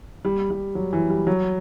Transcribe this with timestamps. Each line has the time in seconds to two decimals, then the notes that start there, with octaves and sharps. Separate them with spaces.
0.25 G3
0.50 G3
0.75 F#3
0.93 E3
1.10 G3
1.27 F#3